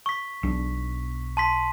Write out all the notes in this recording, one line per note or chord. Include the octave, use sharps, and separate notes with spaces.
C#6 B6
B1 D4
A5 C6 B6